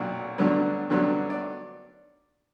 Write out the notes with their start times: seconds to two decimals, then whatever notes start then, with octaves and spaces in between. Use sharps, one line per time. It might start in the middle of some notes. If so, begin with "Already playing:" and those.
Already playing: B1 A#2 F#3 F#5 G5
0.38 G2 D3 F#3 B3
0.90 G2 D3 F#3 B3
1.30 D5